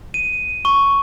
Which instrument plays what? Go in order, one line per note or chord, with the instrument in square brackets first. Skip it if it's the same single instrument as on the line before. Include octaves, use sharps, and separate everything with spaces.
[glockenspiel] D#7
C#6